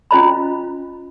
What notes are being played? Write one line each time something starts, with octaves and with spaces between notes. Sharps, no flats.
C#4 F4 C5 D#5 A#5 B5